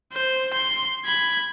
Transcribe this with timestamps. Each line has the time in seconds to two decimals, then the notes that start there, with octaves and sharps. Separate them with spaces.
0.13 C5
0.53 C6
1.05 B5 G#6